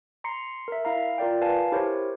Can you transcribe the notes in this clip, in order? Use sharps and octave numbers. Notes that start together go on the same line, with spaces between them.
A#5 C6 C7 C#7
A#4 E5
E4 F5 A#5
F4 A#4 D5 G5
B4 F5 G#5 A5
E4 G4 A#4 C5 C#5